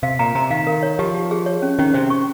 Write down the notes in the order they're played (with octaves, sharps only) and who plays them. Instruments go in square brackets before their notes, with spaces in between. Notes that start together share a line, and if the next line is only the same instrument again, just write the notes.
[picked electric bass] C3 [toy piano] F5
[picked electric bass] A#2 [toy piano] A#5
[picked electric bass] C3 [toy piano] A#5
[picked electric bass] D#3 [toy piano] F5
[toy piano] A#4
C#5
[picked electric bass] F3 [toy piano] G4
[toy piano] G4
G#4
C#5
C#4
[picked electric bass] D#3 [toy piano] C#4
[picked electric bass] C3 [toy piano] C5
[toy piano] C#6